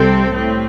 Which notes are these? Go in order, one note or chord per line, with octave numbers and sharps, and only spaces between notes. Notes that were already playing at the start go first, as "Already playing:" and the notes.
Already playing: C2 C3 G3 C4 A4
A2 G3 C4